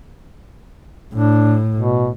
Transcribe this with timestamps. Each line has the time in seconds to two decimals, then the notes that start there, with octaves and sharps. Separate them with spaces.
1.14 A2 D4
1.75 B2